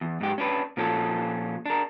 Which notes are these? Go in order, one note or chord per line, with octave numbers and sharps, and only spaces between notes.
E2
G#2 G4
C#4 D4 B4
A#2 F3 C#4 A4
D4 A#4